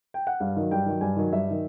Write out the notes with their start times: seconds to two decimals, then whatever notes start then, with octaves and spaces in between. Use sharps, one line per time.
0.14 G5
0.27 F#5
0.40 G2 F5
0.56 D#3 F#3
0.71 G2 G5
0.86 D#3 F#3
1.01 G2 G#5
1.16 D#3 F#3
1.32 G2 E5
1.47 D#3 F#3